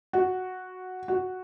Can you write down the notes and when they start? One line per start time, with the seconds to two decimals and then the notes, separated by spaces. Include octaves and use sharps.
0.13 F#4
1.08 F#4